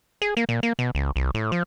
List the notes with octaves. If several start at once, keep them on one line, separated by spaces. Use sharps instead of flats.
G#4
A#3
A#2
A#3
B2
C#2
C2
A2
F3